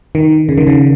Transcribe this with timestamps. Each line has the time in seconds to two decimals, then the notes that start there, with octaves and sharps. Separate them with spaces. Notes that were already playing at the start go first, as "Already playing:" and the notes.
0.15 D#3
0.49 C#3
0.57 D#3
0.67 C#3